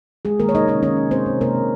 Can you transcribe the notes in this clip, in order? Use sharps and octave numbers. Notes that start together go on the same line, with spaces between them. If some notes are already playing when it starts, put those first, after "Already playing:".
G#3 G#4
D#3 A#3 A#4
C#5
C3 D#4 D#5
D#3 C#4 C#5
D#3 C#4 C#5
C3
G#3 C4 C5
C3
C3 A#3 A#4
C3